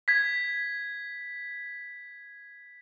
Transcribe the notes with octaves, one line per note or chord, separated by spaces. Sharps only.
G#6 B6